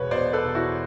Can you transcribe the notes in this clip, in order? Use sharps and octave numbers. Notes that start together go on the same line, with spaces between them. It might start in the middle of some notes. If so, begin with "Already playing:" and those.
Already playing: E1 B2 B4 C#5
B2 C5 D5
A4 B4
E1
E4 F#4